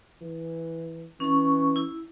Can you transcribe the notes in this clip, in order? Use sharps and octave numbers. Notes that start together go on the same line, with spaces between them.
E3
E3 C#4 C#6
E4